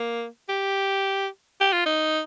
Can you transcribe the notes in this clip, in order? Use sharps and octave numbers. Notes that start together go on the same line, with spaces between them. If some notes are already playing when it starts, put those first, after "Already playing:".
Already playing: A#3
G4
G4
F4
D#4